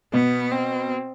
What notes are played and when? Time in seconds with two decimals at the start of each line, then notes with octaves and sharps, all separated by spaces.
0.13 B2 B3
0.51 C4